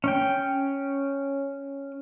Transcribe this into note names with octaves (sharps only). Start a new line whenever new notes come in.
C#4 G5